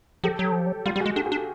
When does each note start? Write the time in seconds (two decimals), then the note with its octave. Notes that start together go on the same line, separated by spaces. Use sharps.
0.24 F3 G4 A4
0.39 F#3
0.52 F3
0.66 F#3
0.86 G3 F4 G4
0.96 G3 G4
1.00 F#4 G#4
1.06 G#3
1.16 D4 G4 A4
1.26 F#4 G#4
1.32 D4